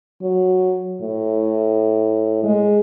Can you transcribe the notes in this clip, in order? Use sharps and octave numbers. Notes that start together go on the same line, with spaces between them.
F#3
A2
G#3